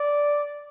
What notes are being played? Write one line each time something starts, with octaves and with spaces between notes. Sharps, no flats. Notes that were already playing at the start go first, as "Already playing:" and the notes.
Already playing: D5